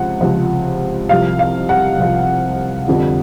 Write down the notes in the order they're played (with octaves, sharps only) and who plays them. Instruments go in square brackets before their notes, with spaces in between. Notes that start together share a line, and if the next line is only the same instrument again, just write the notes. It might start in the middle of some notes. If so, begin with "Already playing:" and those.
Already playing: [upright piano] C#2 C3 F3 F#5
C#2 C3 F3
C2 C3 F3 F5
F5
F#5
C2 C3 F3
F2 D3 G3